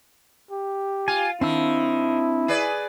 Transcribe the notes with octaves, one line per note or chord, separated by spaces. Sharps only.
G4
F4 G#5
D#3 C4 D4 E4 E6
G#4 B4 D5